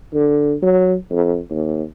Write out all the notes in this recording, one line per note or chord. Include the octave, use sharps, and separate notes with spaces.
D3
F#3
F2
D#2